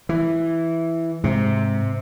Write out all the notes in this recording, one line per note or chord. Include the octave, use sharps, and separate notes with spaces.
E3
G#2 C3